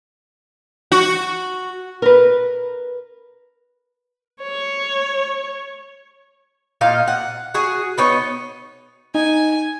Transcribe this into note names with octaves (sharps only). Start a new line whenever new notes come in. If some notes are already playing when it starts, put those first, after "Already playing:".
F#4
A#4 B4
C#5
A#2 D#4 F5
F#5
F#4 G#4
B3 D#4 C#5
D#4 G#5